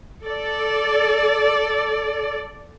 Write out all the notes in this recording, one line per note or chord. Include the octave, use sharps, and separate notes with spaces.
A4 D5